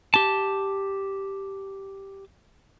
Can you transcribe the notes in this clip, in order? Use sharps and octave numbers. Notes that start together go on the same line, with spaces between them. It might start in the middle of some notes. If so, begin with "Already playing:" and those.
G4 A5